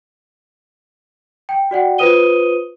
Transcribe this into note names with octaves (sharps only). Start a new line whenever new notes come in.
G5
F#4 D5 F#5 G5
F4 B4 C5 D#6 D#7 G7